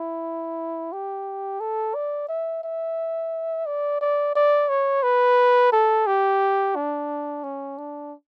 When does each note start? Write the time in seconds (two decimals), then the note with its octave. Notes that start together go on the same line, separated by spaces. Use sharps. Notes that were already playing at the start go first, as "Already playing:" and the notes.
Already playing: E4
0.92 G4
1.60 A4
1.95 D5
2.29 E5
2.64 E5
3.66 D5
4.01 D5
4.35 D5
4.69 C#5
5.03 B4
5.72 A4
6.07 G4
6.76 D4
7.44 C#4
7.78 D4